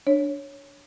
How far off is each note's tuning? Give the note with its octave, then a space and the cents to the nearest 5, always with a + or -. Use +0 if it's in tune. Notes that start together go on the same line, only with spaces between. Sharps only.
D4 +0 C#5 +0